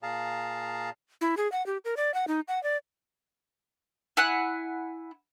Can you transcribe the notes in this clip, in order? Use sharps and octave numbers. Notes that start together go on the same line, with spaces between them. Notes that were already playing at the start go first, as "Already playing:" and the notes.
A#2 G#4 F5 A5 A#5
E4
G#4
F#5
G4
A#4
D5
F#5
D#4
F#5
D5
E4 F#5 G#5 F#6